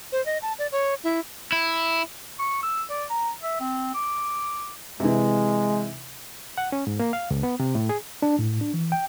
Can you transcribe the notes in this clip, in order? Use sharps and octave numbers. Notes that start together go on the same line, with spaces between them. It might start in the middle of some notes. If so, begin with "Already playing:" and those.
C5
D#5
A5
D5
C#5
E4
E4
C#6
E6
D5
A#5
E5
C4
D6
C3 E3 G#3
F#5
C#4
G#2
A#3
F5
C#2
B3
C3
A2
G#4
D4
A2
D4
E3
G5